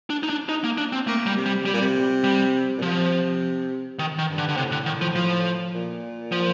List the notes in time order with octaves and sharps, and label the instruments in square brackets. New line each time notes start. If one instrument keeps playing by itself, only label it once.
[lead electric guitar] D4
D#4
D4
D#4
A#3
D4
C4
[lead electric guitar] A3 [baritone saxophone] A#3
[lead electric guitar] G3
[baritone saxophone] C3
[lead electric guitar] G3
[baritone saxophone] C3 [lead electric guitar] G3
[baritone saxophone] A#2
C3
[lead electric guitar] G3
[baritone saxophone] A#2
[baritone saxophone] C3 [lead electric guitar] F3
[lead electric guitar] D#3
D#3
[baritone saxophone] G2
[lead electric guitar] D3
D3
[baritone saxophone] A2 [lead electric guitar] C3
[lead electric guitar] D3
D#3
F3
F3
[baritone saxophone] A#2
[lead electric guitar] F3